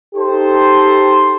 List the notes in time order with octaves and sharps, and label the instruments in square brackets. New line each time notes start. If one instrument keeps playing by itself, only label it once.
[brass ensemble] D#4 G4 A4 C5